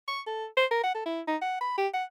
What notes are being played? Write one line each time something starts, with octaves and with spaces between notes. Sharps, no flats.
C#6
A4
C5
A#4
F#5
A4
E4
D#4
F#5
B5
G4
F#5